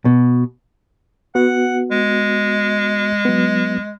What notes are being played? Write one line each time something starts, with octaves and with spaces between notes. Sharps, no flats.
B2
B3 F#4 F#5
G#3
F#3 B3